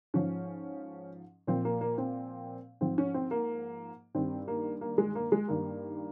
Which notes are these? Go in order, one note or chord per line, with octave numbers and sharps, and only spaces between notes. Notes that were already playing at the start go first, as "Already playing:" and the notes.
G#2 F3 C#4
A#2 F3 C4
A#3
A#3
C4
G#2 F3 C4
C#4
C4
A#3
G2 D#3 C4
A#3
A#3
G#3
A#3
G#3
G2 D#3 A#3